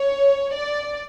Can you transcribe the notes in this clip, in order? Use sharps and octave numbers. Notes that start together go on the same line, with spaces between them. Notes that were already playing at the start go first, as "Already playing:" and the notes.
Already playing: C#5
D5